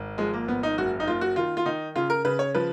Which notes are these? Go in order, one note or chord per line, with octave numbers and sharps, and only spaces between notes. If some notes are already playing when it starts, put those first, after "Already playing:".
Already playing: G#1
F3 G#3
A#3
G#1 B3
D#4
F#1 F#4
D#4
F#1 F4
F#4
D#3 F4
F4
D#3 D#4
C#3 F4
A#4
C#3 B4
C#5
F3 B4